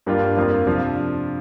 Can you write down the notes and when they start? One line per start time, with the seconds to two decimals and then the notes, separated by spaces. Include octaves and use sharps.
0.06 G2 G3 A#3 D4 F4
0.37 F2 F3 A#3 F4
0.66 C3 F3 D4 F4